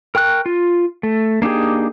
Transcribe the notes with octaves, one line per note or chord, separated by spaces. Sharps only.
A#4 G5 C#6 F#6
F4
A3
A#3 D4 D#4 G4 G#4